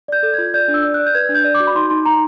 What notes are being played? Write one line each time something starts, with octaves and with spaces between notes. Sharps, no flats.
D5 G6
A4
F4 G#6
D5 G6
D4
E6
D5
F#6
D5
G6
B4 G#6
D4
G6
D5
D6
F#4
B5
D#4 C6
D#4 C6
D#4 A#5